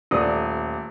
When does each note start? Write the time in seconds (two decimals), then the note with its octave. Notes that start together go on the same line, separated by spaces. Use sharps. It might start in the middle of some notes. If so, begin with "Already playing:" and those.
0.11 D#1 A3 D5 D#6